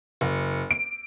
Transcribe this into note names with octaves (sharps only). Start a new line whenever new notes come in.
F#1
D7